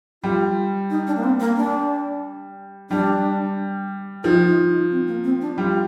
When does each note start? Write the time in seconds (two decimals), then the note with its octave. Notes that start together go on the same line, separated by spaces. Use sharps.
0.23 G3 F4
0.90 D#4
1.07 D4
1.17 A#3
1.24 C4
1.40 A#3
1.57 D4
2.90 G3 D4
4.24 F3 D#4
4.46 D#4
4.68 D#4
4.91 C4
5.07 A#3
5.24 C4
5.41 D4
5.58 G3 F4